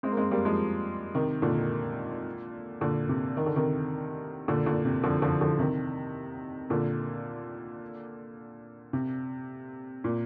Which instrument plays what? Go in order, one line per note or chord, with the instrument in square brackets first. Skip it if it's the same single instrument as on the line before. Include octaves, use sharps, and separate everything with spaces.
[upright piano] G#3 C4
A#3
G#3 C4
G3 A#3
F3 G#3
C3 D#3
A#2 D3
A#2 D3
C3
D#3
D3
C3 D#3
A#2 D3
A#2 D3
C3
D3 F3
D3 F3
D3 F3
C3 D#3
A#2 D3
C3
A#2